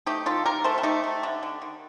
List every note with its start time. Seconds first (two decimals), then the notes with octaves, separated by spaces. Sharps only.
0.06 A3 D#4 G4
0.26 D#3 F4 A4
0.46 D#3 G4 A#4
0.64 A3 A4 C5
0.78 A4
0.83 A3 D#4 G4
1.04 A3
1.23 D3
1.43 D3
1.62 D#3